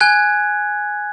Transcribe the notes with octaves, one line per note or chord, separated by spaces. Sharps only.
G#5 F#6 G#6